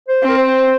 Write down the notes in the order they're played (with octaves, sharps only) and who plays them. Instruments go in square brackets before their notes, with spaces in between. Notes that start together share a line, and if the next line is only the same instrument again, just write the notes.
[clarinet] C5
[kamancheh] C4
[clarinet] A#4
C5